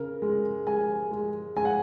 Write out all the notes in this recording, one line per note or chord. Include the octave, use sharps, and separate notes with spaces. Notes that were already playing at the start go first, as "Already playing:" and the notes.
Already playing: C#3 A#4
G#3
G#3 G#5
G#3
G#3 G#5
F#5